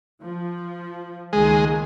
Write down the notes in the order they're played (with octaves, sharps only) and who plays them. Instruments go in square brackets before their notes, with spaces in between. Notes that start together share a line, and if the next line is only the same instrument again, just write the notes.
[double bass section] F3
[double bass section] C#2 D#3 A#3 [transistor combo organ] G#3